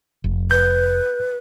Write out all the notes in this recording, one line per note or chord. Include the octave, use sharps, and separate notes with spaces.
F1
B4 G6